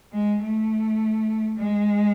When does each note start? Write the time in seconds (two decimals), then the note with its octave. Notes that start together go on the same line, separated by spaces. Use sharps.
0.13 G#3
0.43 A3
1.58 G#3